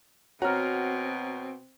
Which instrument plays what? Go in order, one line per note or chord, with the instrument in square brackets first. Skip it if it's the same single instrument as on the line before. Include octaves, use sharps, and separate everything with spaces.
[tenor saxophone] B2 [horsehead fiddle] C4 [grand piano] F#4 A#5 [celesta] C#5 F6